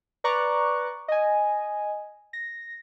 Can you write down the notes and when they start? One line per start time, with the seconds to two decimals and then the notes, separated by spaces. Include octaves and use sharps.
0.24 B4 D5 A#5 C#6 D6 F#6
1.08 D#5 G#5
2.33 A#6